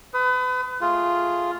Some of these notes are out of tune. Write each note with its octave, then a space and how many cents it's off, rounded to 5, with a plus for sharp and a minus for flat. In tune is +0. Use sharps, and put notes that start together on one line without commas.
B4 +35 D#6 +15
A3 +0 F4 +0 G#4 +0